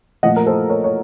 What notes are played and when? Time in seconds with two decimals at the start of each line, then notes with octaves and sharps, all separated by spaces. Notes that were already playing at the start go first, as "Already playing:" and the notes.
0.23 A#2 F3 A3 D#5 F#5
0.36 A#4
0.46 A4 C5
0.70 A#4 C#5
0.84 C#5